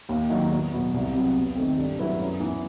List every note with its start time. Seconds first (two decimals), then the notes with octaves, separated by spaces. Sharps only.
0.09 D#2
0.30 D#3 F#3
0.51 E2
0.72 B2 F#3 B3
0.93 C2
1.14 C3 F#3 B3
1.35 E2
1.55 D#3 A3 C4
1.77 G2
1.99 F#3 A3 E4 B4
2.19 F#2
2.40 E3 B3